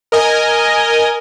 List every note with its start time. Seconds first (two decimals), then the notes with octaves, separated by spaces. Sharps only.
0.12 A#4 D#5 G#5